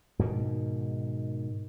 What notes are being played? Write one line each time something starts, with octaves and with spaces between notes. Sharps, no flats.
G#2 B2 D#3